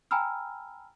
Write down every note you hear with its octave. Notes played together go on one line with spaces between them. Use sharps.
G5 G#5 A#5 B5 E6 F6